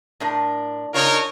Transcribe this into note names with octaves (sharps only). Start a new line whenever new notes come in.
A2 D4 A#4
C#3 D4 D#4 F4 A#4 C#5